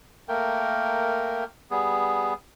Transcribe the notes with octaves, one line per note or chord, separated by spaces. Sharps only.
A3 A#3 A#4 G5
G3 B3 G#4